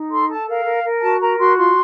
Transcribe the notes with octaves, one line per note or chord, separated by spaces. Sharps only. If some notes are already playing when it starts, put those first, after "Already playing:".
Already playing: D#4
A4 C6
A4 A5
A#4 F5
A#4
A#4
F#4 A5
A#4 A#5
F#4 C6
F4 C6